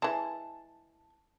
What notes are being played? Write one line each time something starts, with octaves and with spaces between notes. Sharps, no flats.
E3 G#3 A5